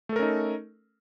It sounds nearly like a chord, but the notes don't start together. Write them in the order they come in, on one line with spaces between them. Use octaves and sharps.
A3 A4 A#4 C#4 D#4